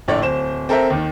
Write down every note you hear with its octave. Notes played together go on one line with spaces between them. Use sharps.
A#1 A2 D3 A3 C#5 D5
D1 C5 E7
C4 A4 A#4 C5 E5
D#2 D#3